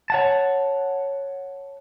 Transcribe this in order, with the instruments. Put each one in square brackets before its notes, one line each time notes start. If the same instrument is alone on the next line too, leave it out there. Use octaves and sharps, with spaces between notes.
[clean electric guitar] C#5 F#5 A5